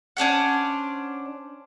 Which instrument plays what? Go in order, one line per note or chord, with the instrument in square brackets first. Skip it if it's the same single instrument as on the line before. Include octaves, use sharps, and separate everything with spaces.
[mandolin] C#4 D4 C5 F#5